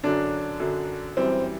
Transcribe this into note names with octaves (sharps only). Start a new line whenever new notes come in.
F#2 D3 F#3 D4
F#2 D3 F#3
F#2 E3 G3 C4